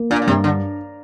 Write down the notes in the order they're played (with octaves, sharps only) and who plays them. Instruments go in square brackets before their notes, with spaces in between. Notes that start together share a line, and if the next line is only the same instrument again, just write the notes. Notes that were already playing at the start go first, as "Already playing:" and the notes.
Already playing: [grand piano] A#3
[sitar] A#2 [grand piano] D4
[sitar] A#2
[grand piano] G2 [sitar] C3
[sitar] D3 [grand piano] D4